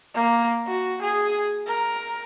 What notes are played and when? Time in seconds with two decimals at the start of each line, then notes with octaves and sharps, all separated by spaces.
0.15 A#3
0.67 F#4
1.02 G#4
1.67 A#4